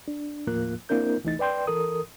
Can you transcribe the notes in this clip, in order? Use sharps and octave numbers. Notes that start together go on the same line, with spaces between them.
D4
D#2 A2 F3 A#3 F4 F#6
A#3 C4 D4 E4 A#4 G6
C2 E3 A3 D#4 A6
B4 D5 G5 C6 G6
E3 A4 A#4 D#6